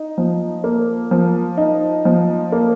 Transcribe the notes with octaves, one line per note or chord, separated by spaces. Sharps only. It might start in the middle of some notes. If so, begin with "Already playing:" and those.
Already playing: D#4
F3
A#3
F3
D#4
F3
A#3